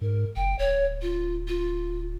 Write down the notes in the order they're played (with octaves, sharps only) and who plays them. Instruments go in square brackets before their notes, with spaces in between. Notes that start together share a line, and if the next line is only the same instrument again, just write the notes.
[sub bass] G#2 [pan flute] A#4
[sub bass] F#1 [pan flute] G5
[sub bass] D1 [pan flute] C#5
[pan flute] F4
F4